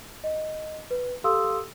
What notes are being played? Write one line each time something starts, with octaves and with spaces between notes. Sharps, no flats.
D#5
B4
G4 A4 F5 C6 D#6 E6